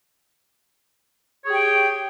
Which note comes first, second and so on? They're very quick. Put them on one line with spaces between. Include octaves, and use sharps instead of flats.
C#5 G#4 G4 G5